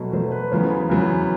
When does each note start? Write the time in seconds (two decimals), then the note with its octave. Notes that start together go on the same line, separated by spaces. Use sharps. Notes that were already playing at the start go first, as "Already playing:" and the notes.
Already playing: B2 F#3 A3
0.13 B2 F#3 A3 C5
0.32 B4
0.51 E2 C#3 F#3 B3 C5
0.89 E2 C#3 F#3 B3